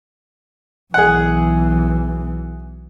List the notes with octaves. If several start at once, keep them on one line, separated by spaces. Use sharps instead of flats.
B1 E3 G#4 F#5